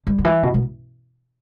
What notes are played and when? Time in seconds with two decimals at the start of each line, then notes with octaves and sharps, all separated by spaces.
0.07 G3
0.18 D3
0.25 E3
0.43 B2
0.54 B2